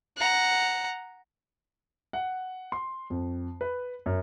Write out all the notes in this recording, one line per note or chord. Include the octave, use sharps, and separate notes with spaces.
F#5 A#5
F#5
C6
F2
B4
F#2